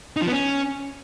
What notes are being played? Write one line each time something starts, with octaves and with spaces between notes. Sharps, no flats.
D#4
F3
B3
C#4